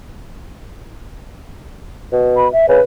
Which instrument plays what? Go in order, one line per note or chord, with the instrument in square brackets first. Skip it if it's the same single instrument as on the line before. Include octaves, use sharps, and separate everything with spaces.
[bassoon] B2
[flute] B5
E5
[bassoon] C#3 [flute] B4